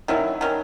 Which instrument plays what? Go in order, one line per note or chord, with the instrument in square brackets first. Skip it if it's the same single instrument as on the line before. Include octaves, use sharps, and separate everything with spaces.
[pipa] D#3 F#3 C#4 [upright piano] E4
[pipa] D#3 F#3 C#4